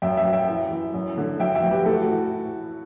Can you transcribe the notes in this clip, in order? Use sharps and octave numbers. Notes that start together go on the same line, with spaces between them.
F#2 E5 G5
E5 G5
F#3
E5 G5
E3
E3
F#2
D3
F#3 E5 G5
E5 G5
F#3
G4 B4
A2 F#4 A4
F#4
E3